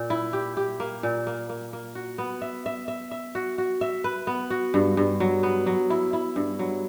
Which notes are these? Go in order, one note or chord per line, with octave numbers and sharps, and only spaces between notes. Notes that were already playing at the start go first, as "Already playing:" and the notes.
Already playing: A#2
E4
G4
G4
A#3
A#2
A#3
A#3
A#3
F#4
B3
E5
E5
E5
E5
F#4
F#4
E5
B4
B3
F#4
G2
G2
F#3
B3
F#3
E4
E4
G2
F#3